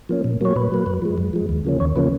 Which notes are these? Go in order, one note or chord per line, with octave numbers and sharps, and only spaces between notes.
F3 A#3 C#4
A#2
F#3 A#3 C#5
A#2 B4
F#3 A#3
F#2
F3 G#3
F#2
F3 G#3
D#2
C#3 F3 A#3 C#4
D#2 C#5
C#3 F3 A#3 C#4 B4